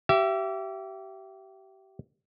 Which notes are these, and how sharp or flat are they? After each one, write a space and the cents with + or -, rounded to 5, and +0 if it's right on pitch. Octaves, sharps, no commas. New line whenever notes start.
G4 -30 E5 +25